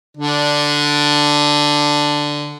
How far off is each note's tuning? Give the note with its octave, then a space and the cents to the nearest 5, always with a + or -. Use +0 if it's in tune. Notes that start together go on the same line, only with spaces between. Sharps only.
D3 +0 D4 +0